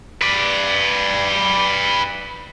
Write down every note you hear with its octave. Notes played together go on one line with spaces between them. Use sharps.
B4 D5